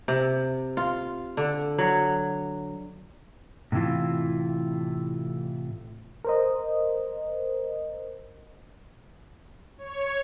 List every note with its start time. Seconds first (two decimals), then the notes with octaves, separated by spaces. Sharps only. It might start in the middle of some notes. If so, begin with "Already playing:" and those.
0.08 C3
0.77 F4
1.37 D3
1.78 F#3
3.72 A2 C3 E3 E4 F4
6.25 A#4 C5 D#5
9.78 C#5